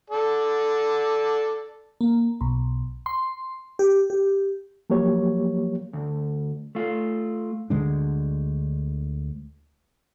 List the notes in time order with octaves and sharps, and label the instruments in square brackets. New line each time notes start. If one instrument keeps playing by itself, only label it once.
[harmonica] A4 D5
[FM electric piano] A#3
B1
C6
G4
G4
[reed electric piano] F3 F#3 A#3 G4 C#5
[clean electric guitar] D2
A3 F4
[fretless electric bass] D2 D3 G#3 D4